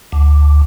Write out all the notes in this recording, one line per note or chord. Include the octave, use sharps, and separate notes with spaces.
D2